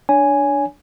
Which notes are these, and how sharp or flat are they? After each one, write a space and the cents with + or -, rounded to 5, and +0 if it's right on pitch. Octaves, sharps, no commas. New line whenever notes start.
D4 +0 C#5 +30 G#5 +0